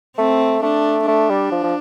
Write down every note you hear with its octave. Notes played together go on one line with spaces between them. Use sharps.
A3 C4
A3 D4
A3 D4
G3
F3
F3